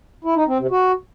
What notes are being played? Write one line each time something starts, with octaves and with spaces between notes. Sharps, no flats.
E4
D#4
C4
C3
F#4